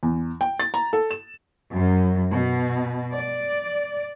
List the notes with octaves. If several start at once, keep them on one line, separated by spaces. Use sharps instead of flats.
E2
G5
A6
A#5
A4
E7
F#2
B2
D5